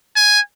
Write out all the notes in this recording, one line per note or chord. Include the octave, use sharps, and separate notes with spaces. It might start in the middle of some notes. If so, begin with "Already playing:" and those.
G#5